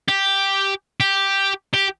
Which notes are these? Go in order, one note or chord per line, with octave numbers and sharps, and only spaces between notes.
G4
G4
G4